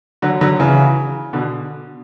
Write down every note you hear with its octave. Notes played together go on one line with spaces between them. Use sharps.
D3 F#3
D3 F#3
C#3 E3
B2 D3